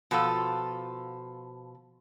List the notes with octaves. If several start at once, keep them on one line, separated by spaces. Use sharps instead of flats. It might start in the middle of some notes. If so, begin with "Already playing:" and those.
B2 F3 F4 A4